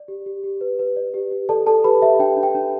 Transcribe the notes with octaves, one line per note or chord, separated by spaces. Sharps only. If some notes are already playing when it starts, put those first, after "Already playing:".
Already playing: D5
G4
G4
G4
B4
B4
D5
G4
G4
A4 D5 A5
A4 D5 A5
G4 B4 B5
G4 E5
D4 G5
D4
G5
D4